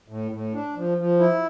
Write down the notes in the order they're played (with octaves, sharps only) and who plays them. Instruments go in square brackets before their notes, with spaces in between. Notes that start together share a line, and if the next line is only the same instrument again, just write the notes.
[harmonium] A2
A2
D4
F3
F3
E4